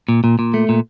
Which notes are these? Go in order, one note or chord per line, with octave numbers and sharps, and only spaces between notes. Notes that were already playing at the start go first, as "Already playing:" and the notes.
A#2
A#2
A#2
A3
A#2